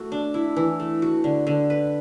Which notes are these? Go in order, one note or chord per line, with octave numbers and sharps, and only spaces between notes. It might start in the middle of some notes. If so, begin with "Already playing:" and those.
Already playing: A3 F#4
D4
E4
E3
A3
F#4
D3
D3
B4